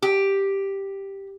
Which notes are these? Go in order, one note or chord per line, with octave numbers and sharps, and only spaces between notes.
G4